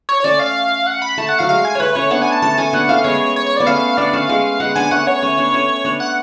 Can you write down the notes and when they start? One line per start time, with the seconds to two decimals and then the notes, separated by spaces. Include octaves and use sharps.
0.09 C#5
0.20 C#5
0.24 A3 C#4 D5
0.40 F5
0.87 F#5
1.02 B5
1.18 A3 A5
1.29 F#5
1.39 F#3 F5
1.49 G#3 F5
1.65 G#5
1.75 C#5
1.80 A3 B4
1.95 A3 C#4 C#5
2.11 B3 D4 F#5
2.22 G#5
2.32 A5
2.42 A3 C#4 A5
2.58 A3 C#4 G#5
2.73 B3 D4 F#5
2.89 A3 C#4 F5
3.04 G#3 B3 C#5
3.36 C#5
3.46 C#5
3.57 B3 D5
3.67 A3 C#4 F5
3.97 B3 D4 D5
4.13 A3 C#4 F5
4.29 G#3 B3
4.60 G#3 B3 F#5
4.76 B3 D4 G#5
4.91 A3 C#4 F#5
5.07 C#5
5.23 A3 C#4
5.37 B3 D4
5.54 A3 C#4
5.85 B3 D4
6.00 F#5